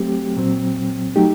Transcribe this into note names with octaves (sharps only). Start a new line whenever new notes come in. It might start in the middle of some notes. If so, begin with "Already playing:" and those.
Already playing: F#3 A3 C4 G4
A#2 F#3 C4
F#3 A3 D#4 G4